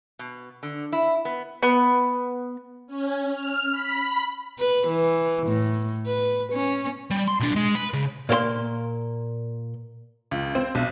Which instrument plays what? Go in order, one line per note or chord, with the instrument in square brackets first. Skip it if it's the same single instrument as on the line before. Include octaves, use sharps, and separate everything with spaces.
[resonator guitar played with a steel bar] B2
D3
E4
B3
[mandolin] B3
[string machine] C#4
F6
B5
[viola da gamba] B4
E3
A2
B4
C#4
[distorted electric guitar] G3
C6
B1 D4
G#3
B4
C#3
[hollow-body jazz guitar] A#2 A#3 C5 C6
[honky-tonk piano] C#2
C4
B1